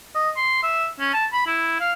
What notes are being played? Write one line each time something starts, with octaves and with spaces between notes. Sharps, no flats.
D#5
C6
E5
C#4
A5
B5
E4
F5